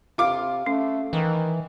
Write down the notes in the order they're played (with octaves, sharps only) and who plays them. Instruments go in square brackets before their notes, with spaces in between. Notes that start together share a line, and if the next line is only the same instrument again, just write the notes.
[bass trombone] C3 [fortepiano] F4 D6
[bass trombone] A3 [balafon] C#4
[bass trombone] D#3 [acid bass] E3